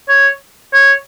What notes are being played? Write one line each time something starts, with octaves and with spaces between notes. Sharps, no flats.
C#5
C#5